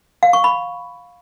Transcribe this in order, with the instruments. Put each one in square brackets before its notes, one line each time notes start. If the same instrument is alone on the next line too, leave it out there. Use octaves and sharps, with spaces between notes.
[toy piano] F5
C#6
B5